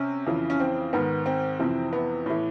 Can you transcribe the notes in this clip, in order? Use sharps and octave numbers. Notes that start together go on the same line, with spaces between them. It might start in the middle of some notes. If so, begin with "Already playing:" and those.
Already playing: C3 C#4
F2 C#3 E3
C#4
C4
G#2 D#3 B3
C4
F2 C3 E3
B3
A2 E3